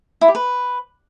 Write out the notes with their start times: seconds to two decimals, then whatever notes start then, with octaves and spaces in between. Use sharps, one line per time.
0.21 E4
0.28 G4
0.35 B4